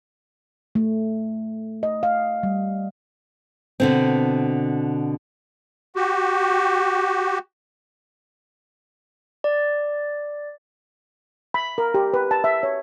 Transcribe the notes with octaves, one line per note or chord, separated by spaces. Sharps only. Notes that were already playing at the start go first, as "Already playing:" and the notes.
A3
D#5
F5
G3
B2 D3 C4
F#4 G4
D5
B5
A#4
G4
B4
A5
E5
C#5